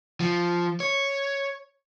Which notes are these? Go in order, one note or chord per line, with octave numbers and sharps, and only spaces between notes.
F3
C#5